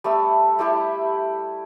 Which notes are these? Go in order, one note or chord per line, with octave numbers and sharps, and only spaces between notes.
G3 A3 E5 A5
G3 A3 E4 G4